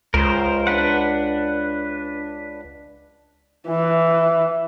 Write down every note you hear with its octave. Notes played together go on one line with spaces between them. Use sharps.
C#2 A#4 C5
D4 B4 F#5
E3